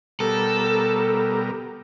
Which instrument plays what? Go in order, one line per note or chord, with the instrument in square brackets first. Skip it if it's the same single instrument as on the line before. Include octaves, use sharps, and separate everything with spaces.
[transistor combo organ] B2 G3 A#4 [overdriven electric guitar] A4